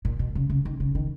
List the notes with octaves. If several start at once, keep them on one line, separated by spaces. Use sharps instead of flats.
A#2
B2
C#3
C#3
D#3
C#3
D#3